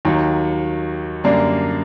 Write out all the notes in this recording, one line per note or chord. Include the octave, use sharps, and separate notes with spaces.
D#2 D#3 F#3
F#2 D3 G3 A#3 D4